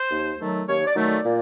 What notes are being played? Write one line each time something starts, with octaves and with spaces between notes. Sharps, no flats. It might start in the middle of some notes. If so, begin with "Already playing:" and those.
Already playing: C5
D#2
D#3 F#3 A3
D#2 C#5
D5
D#3 F#3 A3
D5
A#2